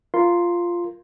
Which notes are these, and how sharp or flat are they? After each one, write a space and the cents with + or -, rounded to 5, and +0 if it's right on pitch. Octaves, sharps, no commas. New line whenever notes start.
F4 -5 A#4 +0 C6 +0